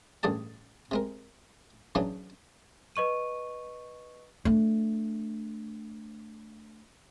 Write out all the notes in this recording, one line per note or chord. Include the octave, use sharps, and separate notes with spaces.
A1 G2 G#4 D5 A5
C3 G#3 A#4
C#3 E3 F#3 D4 D#4
B4 D#5 C#6 D#7
A3 D4